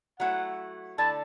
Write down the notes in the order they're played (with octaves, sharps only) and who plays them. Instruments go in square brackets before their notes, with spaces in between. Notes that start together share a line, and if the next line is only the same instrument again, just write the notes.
[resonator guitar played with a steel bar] F#3 A3 E4 [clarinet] F#5
[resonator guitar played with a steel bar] D3 A3 E4 A4 D5 [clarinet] A5